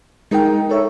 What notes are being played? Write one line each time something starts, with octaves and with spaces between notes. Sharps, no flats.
G#3 D#4 A#4 G5
A4 A#4 C#5 E5